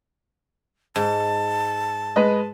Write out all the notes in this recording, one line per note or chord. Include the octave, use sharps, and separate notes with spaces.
G#2 A5
G#3 B4 D#5